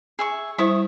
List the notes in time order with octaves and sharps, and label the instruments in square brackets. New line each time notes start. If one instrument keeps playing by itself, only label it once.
[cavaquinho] G#4 E5 C#6
[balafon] G3 E4 C5 [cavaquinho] E5 C#6 D#6